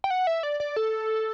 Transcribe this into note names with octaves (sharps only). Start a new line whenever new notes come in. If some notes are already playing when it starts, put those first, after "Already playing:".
G5
F#5
E5
D5
D5
A4